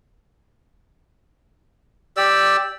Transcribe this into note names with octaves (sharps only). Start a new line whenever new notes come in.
G4 D5 E6